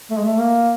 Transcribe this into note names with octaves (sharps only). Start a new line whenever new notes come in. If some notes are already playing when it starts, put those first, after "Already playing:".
A3
G#3
A3
A#3